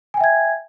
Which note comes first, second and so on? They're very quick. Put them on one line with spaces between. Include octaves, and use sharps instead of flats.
G#5 G5 E5 G#6